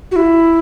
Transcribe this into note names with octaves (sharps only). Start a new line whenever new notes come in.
F#4
E4